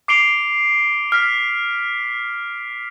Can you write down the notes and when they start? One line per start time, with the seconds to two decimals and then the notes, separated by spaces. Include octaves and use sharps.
0.08 D6 C7 D7 F7 G7
1.12 F6 B6